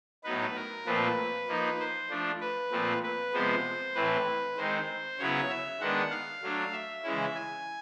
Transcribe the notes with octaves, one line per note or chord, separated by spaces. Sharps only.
A2 F#3 B3 D#4 B4
A#4
A#2 F3 A3 C4 B4
F3 A#3 D#4
C5
F3 A3 D4
B4
A#2 F3 A3 C4
B4
C3 F3 G#3 B3 C5
A2 E3 A3 C4 B4
D#3 G#3 C4 D#4 C5
C#3 F#3 B3 E4 C#5
E5
D#3 G#3 B3 D4 F#5
F5
F#3 A3 D4
E5
C#3 E3 G#3 C#4 E4
G#5